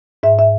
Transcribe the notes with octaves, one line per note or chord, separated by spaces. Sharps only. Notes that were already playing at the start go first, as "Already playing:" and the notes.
G#2 E5
E5